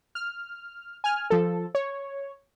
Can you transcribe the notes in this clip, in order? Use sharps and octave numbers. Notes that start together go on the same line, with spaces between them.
F6
G#5 F6
F3 A4
C#5